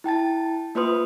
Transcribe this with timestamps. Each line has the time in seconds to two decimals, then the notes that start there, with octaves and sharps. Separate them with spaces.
0.04 E4 G5 A5 A6
0.75 A#3 F4 B4 C5 C6 D#6